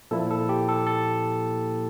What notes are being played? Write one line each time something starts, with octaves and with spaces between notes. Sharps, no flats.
A#2 F3 A#3 E4 A4
A4
G4
A4
A4